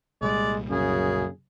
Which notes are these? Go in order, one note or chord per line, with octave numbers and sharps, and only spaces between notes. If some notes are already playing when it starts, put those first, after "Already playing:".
C2 A#2 G3 G#3 D5
F#2 C#3 G#4